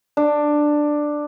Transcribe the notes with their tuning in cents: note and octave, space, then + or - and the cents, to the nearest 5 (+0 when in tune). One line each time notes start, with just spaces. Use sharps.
D4 +10